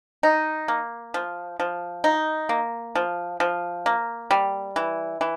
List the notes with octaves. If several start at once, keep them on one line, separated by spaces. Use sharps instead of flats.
D#4
A#3
F3
F3
D#4
A#3
F3
F3
A#3
G3
E3
E3